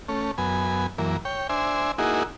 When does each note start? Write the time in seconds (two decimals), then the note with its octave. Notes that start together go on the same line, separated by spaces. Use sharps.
0.09 A3 C#4
0.38 F#2 B3 G#5
0.98 F#2 E3 A#3
1.25 C#5 G5
1.49 D4 C5 E5 G#5
1.98 A#3 D#4 E4 F#4 G#4